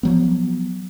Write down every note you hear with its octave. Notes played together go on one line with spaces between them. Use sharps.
F3 F#3 B3